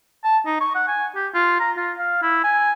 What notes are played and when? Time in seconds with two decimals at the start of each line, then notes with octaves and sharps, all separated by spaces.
0.24 A5
0.46 D#4
0.61 C#6
0.75 F#5
0.88 G#5
1.15 G4
1.34 F4
1.60 A#5
1.77 F4
1.98 F5
2.23 E4
2.44 G#5